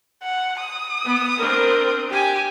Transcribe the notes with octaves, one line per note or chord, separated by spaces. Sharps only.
F#5
D#6
B3
C4 D4 A#4
G4 G#5